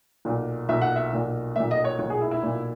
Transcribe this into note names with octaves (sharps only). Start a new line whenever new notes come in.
B1 A#2
B1 A#2 E5
F#5
E5
B1 A#2
B1 A#2 E5
D#5
C#5
B1 C#5
A#2
G#4
E4
E4
B1 A#2